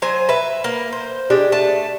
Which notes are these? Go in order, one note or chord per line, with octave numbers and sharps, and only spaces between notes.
F#3 C5 G#5
B4 E5
A#3
C5
G#3 D4 G4
A3 A5